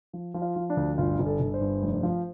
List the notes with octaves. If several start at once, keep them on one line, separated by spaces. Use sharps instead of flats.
F3
F3
F4
F3
D4
D2
G1 F4
G1
A4
G1
C5
G2
F1
F3